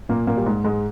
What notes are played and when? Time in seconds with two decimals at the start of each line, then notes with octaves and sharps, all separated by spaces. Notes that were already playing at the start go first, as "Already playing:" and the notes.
0.09 A#2 A#3
0.27 A#2 A#3
0.37 G3
0.46 G#2 G#3
0.64 G#2 G#3